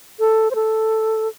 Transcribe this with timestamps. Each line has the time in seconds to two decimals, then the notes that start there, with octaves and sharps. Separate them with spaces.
0.20 A4
0.51 C5
0.55 A4